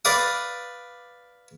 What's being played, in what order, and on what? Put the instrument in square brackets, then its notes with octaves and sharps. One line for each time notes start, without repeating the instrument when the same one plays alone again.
[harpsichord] B4 D5 F5 D6 D#6